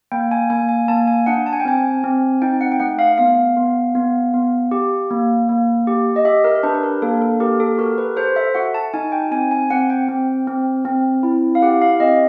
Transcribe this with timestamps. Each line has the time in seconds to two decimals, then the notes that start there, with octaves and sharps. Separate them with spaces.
0.12 A#3 G5
0.31 G#5
0.50 A#3 G#5
0.69 G#5
0.88 A#3 A5
1.07 G#5
1.26 D4 F#5
1.46 A5
1.53 G#5
1.60 G5
1.65 C4 G#5
2.04 C4
2.42 D#4 G5
2.61 F#5
2.72 G5
2.80 A3 F#5
2.99 F5
3.18 B3 F5
3.57 B3
3.95 B3
4.34 B3
4.71 G4
5.11 A#3
5.49 A#3
5.87 G4
6.16 D#5
6.25 G4 E5
6.44 A#4
6.56 A#4
6.63 D4 B4
6.74 B4
6.83 A#4
7.02 A#3 A4
7.22 A4
7.40 G4 A#4
7.60 A4
7.78 F#4 A#4
7.98 B4
8.17 A4 C5
8.36 E5
8.55 F#4 F#5
8.74 A5
8.94 D#4 G#5
9.12 G5
9.31 C4 G#5
9.51 G#5
9.70 C4 F#5
9.90 G5
10.09 C4
10.47 C4
10.85 C4
11.23 E4
11.55 F5
11.62 G4 F#5
11.82 F5
12.00 C4 D#5